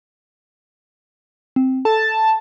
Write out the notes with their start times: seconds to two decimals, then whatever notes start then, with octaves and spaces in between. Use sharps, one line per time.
1.56 C4
1.85 A4 A5